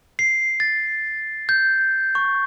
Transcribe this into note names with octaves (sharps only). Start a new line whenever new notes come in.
C7
A6
G6
C#6